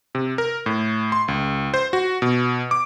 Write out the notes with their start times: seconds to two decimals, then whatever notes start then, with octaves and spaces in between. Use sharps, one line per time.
0.15 C3
0.38 A#4
0.66 A2
1.12 C6
1.28 C#2
1.74 C5
1.93 F#4
2.22 B2
2.71 D6